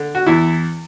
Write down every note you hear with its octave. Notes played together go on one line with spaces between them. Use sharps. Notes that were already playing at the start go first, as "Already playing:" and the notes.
Already playing: D3
F#4
E2 E4